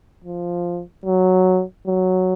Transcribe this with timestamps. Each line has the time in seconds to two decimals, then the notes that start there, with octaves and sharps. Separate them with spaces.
0.24 F3
1.05 F#3
1.87 F#3